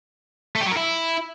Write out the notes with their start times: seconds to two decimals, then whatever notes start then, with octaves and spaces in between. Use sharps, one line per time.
0.56 A3
0.61 G4
0.66 F#3
0.71 A#4
0.77 E4